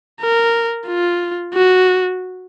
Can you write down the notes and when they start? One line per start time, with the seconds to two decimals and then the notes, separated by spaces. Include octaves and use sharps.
0.21 A#4
0.88 F4
1.54 F#4